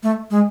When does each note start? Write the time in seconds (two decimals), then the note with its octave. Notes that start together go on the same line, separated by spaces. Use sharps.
0.03 A3
0.31 G#3